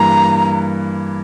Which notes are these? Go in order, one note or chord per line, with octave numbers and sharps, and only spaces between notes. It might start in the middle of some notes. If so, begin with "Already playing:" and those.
Already playing: G2 E3 A#3 A#5